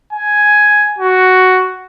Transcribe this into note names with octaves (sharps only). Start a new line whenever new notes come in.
G#5
F#4